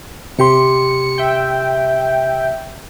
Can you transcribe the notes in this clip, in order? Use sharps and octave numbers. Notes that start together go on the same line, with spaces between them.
C3 G4 C6 C#7
E5 G5